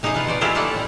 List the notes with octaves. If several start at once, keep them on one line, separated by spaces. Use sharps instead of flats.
C3 D#4 G#4 C5 D#5
F4 B4
B2 C5 D5
C4 E4 F4 G4 G#4
A3 A#3 D#4 E4 D5 F#5
A2 G3